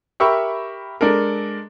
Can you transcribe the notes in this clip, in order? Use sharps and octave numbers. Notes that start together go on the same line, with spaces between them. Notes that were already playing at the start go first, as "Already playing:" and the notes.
G4 A#4 E5 B5 C#6 E6
G#3 D4 A4 A#4